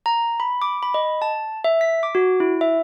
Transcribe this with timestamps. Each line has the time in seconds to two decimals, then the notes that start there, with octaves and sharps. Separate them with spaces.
0.06 A#5
0.40 B5
0.62 D6
0.83 B5
0.94 D#5
1.22 A5
1.64 E5
1.81 B6
2.03 D6
2.15 F#4
2.40 E4
2.61 E5